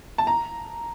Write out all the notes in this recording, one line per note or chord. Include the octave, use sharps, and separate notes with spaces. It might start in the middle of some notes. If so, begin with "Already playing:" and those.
A5
A#5